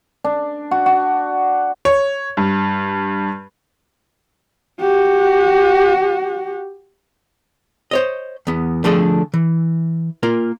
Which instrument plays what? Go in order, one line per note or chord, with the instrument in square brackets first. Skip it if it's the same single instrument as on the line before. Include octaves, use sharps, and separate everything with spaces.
[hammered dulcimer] D4
F#4
F#4
[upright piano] C#5
G2
[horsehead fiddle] F#4 G4
[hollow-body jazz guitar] C5 C#5 D#5
E2 B3
D3 F3 A3 D4 G#4 A4
E3
A#3 F4 A#4